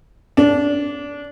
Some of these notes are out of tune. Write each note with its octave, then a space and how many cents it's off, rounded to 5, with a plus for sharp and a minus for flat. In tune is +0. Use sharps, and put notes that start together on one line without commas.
D4 -20